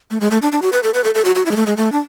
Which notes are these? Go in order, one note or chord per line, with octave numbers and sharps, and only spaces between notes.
A3
G#3
A3
D4
D4
F#4
B4
A4
B4
A4
A4
F#4
F#4
E4
G#3
A3
G#3
A3
D4